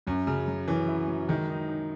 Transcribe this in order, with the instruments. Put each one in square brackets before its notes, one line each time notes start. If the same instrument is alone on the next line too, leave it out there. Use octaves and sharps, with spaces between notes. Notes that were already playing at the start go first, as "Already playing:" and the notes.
[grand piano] F#2 [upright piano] F#3
[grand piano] C#3 [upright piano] F#3
[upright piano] F#3
[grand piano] E3 [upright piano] C#4
[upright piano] E4
F#3
[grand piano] D#3 [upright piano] G#3
[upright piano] D#4
D#4